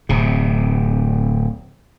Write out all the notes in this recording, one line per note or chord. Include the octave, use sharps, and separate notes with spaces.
D1 C3